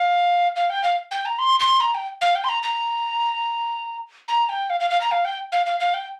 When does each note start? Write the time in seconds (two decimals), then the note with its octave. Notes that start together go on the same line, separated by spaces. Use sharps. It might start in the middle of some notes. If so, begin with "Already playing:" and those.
Already playing: F5
0.56 F5
0.70 G5
0.84 F5
1.11 G5
1.25 A#5
1.39 C6
1.60 C6
1.80 A#5
1.95 G5
2.21 F5
2.35 G5
2.44 C6
2.49 A#5
2.63 A#5
4.28 A#5
4.49 G5
4.70 F5
4.80 F5
4.90 F5
5.01 A#5
5.11 F5
5.25 G5
5.52 F5
5.66 F5
5.80 F5
5.94 G5